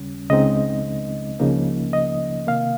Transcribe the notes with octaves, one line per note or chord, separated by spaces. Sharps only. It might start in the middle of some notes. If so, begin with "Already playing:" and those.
Already playing: D#2 C#3 G3 C#4
C#2 C#3 G#3 C4 D#4 D#5
C#2 C#3 F3 A#3 D#4
D#5
C3 D#3 A#3 F5